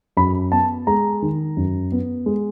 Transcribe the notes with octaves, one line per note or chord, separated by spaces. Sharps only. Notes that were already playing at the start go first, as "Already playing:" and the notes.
F#2 B5
B3 A5
G#3 A#5
D#3
F#2
B3
G#3